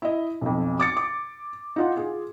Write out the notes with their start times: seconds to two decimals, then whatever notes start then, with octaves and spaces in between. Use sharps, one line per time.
0.02 E4 D#5
0.41 B1 F2
0.80 D6 A6 C#7
0.97 D6
1.76 D#4 F4 F#5
1.97 F4 G#4